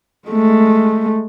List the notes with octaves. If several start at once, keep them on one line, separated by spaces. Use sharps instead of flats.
G#3 A3